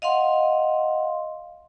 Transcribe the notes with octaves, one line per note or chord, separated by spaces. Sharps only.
D#5 F5 F#5 C6